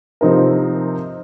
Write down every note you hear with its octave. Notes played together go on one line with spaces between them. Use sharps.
C3 F3 C4 D#4 A#4